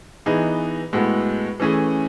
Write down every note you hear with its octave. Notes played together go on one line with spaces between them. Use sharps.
E3 B3 D#4 G#4
A2 G#3 B3 F#4 A4
E3 A3 C#4 G#4